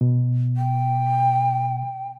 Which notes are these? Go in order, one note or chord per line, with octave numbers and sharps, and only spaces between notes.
B2
G5